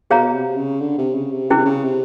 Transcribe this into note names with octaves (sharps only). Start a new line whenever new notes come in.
B2 G#4 C#5 F5 A#5
C3
C#3
D3
C3
C#3
C3
C#3 C#4 E4 G#4
C3
C#3
C3